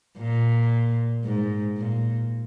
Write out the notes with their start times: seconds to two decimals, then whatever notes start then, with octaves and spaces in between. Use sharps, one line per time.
0.18 A#2
1.24 G#2
1.77 A#2